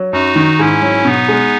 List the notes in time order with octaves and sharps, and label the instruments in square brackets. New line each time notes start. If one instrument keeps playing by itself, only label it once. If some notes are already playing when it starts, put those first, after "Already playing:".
Already playing: [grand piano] F#3
[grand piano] F#2 [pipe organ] D#4 F#4
[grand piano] D#3
[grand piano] G#2 [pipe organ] C#4 E4
[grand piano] F#3
[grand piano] B2 [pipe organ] B3 D#4
[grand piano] G#3